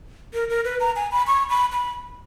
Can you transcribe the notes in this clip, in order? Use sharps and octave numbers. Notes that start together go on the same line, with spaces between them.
A#4
A#4
B4
A#5
G#5
B5
C#6
B5
B5